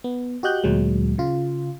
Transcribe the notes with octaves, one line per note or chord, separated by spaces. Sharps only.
B3
F#4 G4 D#5 F#6 G6
D2 A#2 F#3 G#3
C#3 F4